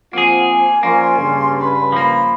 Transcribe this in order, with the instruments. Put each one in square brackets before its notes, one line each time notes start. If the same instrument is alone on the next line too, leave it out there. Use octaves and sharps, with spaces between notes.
[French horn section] F3 C4 F4 [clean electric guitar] A#3 G#4 [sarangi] F#5
[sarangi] G#5
[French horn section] F3 A#4 [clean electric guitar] A#3 [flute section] C#4 D5 C6
[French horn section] G2 C#3
[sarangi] B4
[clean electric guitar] F3 A#3 [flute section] B5